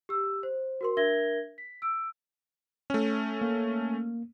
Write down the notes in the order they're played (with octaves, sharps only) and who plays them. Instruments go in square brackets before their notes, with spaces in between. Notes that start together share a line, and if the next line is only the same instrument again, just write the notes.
[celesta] G4 E6
C5
F#4 A#4 C6
D4 A#4 E5 G#6 A#6 G7
B6
E6 D7
[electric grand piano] A3 C#4
[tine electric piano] A#3